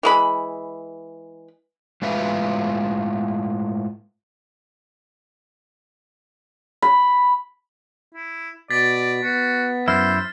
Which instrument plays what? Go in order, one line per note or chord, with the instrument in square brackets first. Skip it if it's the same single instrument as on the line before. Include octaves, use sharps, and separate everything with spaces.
[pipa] E3 G#3 B5
[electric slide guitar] A2 G#3 F4 B4 E5
[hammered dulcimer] B5
[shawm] E4
[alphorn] B2 [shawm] D5 [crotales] A6 B6
[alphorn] B3 [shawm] F#4
[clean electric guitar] F#2 E4 [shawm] C5 [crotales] F6